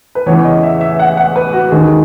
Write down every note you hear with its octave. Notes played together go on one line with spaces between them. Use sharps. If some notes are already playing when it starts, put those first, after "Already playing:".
B4
E2 C#3 E3 C#5
D#5
E5
E5
F#5
F#5
B4
F#4
D#2 D#3 G#3 G#4